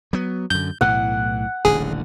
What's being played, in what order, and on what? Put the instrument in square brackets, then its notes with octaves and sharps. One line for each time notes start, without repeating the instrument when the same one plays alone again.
[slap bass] F#3 B3
[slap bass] F#2 D3 [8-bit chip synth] G6
[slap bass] B1 A2 E3 [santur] F#5
[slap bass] D#1 A1 D3 [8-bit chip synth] G#4